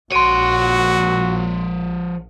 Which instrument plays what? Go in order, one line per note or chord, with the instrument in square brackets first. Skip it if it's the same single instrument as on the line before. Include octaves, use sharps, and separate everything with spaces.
[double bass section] A#1 [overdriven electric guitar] F3 C#5 [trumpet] F#4 [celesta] C6 D7 D#7